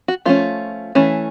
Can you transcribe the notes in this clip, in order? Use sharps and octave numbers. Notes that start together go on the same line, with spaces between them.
F#4
F3 A3 C#4 F4
E3 A3 C#4